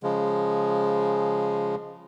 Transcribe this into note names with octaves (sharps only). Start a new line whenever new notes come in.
C#3 F3 G#3